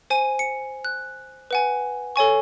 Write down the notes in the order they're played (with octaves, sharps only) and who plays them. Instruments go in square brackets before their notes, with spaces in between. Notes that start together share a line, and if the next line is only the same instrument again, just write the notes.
[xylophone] C5 G#5 D#7
C#7
F#6
B4 F#5 G#5
A4 C#5 G#5 C#6